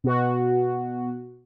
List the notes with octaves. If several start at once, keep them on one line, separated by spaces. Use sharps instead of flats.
B2 F#4